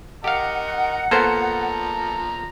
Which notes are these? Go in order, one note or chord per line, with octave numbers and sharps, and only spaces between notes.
G4 A#4 D#5 F5 F#5
F3 A#3 B3 A4 C5 A#5